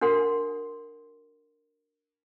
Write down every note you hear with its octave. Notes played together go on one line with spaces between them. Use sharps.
D4 F#4 A#4 F#5 C6